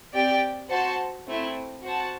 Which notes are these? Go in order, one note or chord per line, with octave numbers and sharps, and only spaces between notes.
C4 G4 D5 G5
F#4 C5 F#5 A5
A3 C4 E4
F#4 C5 F#5 A5